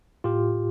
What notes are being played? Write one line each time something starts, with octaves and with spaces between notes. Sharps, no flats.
A2 F4 G4